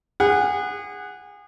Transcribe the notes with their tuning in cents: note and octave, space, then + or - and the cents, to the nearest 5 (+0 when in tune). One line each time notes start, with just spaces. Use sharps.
G#4 -30 F#5 +0